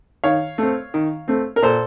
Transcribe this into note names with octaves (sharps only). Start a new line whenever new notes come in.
D#3 C#5 F5
A3 C4
D#3
A3 C4
A#4
A#2 A4 C5